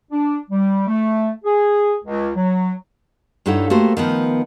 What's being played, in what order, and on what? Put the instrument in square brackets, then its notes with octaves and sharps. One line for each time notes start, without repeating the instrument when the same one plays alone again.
[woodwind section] D4
G3
A3
G#4
C#2
F#3
[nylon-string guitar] G2 D#4 E4 A4 C#5 F#5
A3 A#3 F#4 G4 C5
D#3 F3 B3